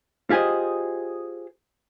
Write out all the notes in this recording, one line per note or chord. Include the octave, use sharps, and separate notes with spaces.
F4 G4 G#4 C5 D#5